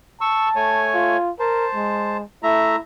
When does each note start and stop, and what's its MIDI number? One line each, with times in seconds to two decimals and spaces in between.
0.21 0.87 81
0.21 0.49 85
0.21 0.49 88
0.56 1.17 57
0.56 1.17 73
0.56 1.17 80
0.94 1.31 65
1.40 1.68 70
1.40 2.17 72
1.40 2.17 81
1.75 2.23 56
2.43 2.76 57
2.43 2.80 64
2.43 2.76 76
2.43 2.76 82